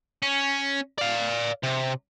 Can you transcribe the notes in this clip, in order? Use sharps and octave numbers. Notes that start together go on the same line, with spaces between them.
C#4
D5 F5
C3